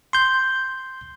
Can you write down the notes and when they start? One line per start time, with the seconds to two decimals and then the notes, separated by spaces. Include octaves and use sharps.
0.13 C6 G6